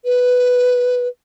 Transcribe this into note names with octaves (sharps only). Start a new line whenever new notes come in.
B4